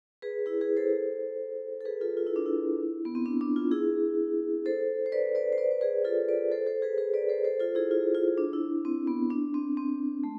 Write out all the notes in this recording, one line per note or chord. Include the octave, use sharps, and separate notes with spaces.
G#4 B4
E4 G#4
G#4 B4
A4 C5
A4
G#4 B4
F4 A4
F4
E4
D4
E4
B3
C4
D4
D4
F4
E4 G#4
A4 C5
C5
B4 D5
B4 D5
C5
B4 D5
C5
G#4 B4
F4 A4
B4 D5
A4 C5
A4 C5
G#4 B4
G#4 B4
B4 D5
A4 C5
A4 C5
F4 A4
E4 G#4
F4
F4
D4
E4
C4
B3
D4
C4
C4
A3